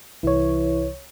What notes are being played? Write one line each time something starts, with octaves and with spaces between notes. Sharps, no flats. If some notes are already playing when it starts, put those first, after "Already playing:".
C2 E3 C#5